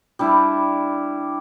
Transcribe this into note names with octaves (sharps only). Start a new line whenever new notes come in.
G3 D4 E4